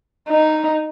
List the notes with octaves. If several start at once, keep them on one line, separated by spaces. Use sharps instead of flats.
D#4